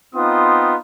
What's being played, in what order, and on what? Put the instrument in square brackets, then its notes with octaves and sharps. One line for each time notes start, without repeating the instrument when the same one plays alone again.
[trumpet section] B3 C4 D#4 F4 C6 D#6